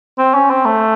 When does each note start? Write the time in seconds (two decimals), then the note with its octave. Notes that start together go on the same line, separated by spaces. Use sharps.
0.18 C4
0.34 C#4
0.50 C4
0.65 A3